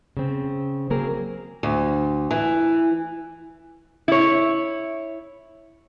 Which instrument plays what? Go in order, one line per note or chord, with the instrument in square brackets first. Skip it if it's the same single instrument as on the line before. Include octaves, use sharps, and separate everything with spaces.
[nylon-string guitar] C#3 C4
F#3 A#3 C4 G#4 A#4
[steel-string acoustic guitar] D2
E3
[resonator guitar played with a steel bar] E4 C#5